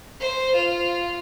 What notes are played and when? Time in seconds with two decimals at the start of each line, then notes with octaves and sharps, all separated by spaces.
0.20 C5
0.54 F4